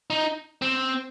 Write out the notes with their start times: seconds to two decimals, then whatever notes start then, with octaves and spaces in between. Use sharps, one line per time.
0.10 D#4
0.62 C4